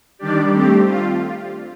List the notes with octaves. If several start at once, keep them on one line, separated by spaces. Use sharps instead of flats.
D#3 G3 D4 G4 D5
A3 C4 G4
F4